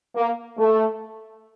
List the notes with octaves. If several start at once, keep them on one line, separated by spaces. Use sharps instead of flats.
A#3
A3